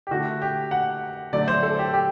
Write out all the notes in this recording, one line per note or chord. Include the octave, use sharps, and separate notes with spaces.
G4
D3 A3 F#4
G4
F#5
D3 F#3 A3 D5
C5
A4
G4
G4